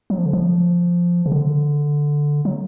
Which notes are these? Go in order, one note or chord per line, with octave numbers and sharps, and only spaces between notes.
F#3
F3
D3
F3
C#3
D3
F#3